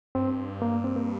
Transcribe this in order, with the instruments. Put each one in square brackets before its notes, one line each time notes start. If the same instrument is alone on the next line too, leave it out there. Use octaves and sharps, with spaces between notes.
[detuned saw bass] G2 [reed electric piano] C4
[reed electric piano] A#3
C4
A#3